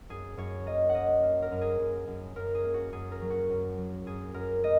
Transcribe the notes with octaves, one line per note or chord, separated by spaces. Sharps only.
F#2 G#4
F#2 C#5
A#3 D#5
F#5
A#3 D#5
A#3
A#4
F#2
G#4
F#2
F#2
F#2 A#4
G#4
A#3
F#4
F#2 G#4
A#4
F#3
F#4
F#2
F#3
F#2 G#4
F#2 A#4
A#3 D#5